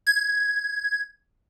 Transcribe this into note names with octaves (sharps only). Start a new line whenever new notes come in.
G#6